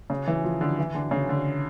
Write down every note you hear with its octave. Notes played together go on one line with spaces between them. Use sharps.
C#3
E3
F3
D3
E3
D3
C#3
D3